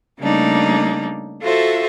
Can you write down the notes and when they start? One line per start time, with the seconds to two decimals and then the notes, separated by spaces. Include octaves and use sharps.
0.19 C#3 G3 A3 A#3 D4 D#4
1.41 F4 F#4 A4 C5 E5